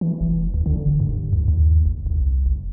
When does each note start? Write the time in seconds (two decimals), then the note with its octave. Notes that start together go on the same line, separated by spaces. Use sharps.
0.01 E3
0.21 F1
0.54 D2
0.66 D3
0.86 F1
1.00 G2
1.33 D2
1.48 D#2
1.86 F#1
2.06 C2
2.46 F#1